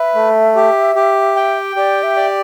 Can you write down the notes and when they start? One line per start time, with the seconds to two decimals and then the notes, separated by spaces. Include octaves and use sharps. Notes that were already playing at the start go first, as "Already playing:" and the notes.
Already playing: B4 E5
0.15 A3
0.56 G4
0.95 G4
1.36 G5
1.76 G4 D5
2.03 E5
2.17 D5